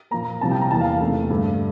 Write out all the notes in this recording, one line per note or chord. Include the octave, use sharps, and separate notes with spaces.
A#2 F3 A#3 A#5
C2 C3 F3 A5
G5
A#5
E2 E3 A#3 A5
F5
F5
E2 C3 E3 A3
G2 D3 A3